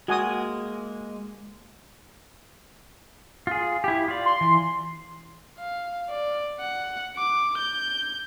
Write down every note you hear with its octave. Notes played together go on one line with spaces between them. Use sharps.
G#3 A#3 F#4 G#5 D#6
F4 G#4
E4 G4
F4 D5
C6
E3
F5
D5
F#5
D6
G6